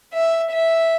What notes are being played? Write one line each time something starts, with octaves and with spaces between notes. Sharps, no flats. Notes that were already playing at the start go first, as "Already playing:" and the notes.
E5
E5